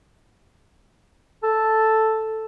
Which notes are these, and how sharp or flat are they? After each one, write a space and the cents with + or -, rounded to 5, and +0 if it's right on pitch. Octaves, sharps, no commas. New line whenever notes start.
A4 +0